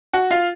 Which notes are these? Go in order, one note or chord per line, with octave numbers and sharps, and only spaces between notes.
F#4 F#5
F4 F5